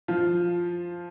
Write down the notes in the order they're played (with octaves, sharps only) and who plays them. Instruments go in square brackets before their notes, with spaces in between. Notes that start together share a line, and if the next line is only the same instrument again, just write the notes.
[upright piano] F3 F4